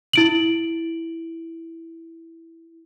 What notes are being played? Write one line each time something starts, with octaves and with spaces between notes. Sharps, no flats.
E4 D7 F#7